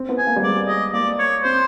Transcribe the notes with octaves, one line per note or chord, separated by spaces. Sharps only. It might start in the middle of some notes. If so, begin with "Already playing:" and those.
Already playing: C4
B3
G#5
A#3
G3
G#3 D5
D#5
A#3 D5
C#5
C4 C5